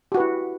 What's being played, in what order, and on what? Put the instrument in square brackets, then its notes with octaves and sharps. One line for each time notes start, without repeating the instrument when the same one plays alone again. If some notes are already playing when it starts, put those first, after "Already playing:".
[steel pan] G4
F#4
B4
E4